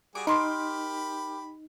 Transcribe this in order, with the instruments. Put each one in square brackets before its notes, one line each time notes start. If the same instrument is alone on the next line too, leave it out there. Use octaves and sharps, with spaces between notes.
[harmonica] G3 F#4 G#4 [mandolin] D6
[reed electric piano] D#4 [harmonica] G4 B5 [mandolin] A#4 C6 D6